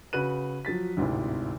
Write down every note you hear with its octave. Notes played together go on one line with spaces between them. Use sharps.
C#3 F#4 B4 F#6 D#7
F3 F#3 A6 B6
G#1 D2 A2 C3